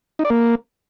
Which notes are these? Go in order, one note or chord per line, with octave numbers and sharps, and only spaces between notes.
D#4
D5
A#3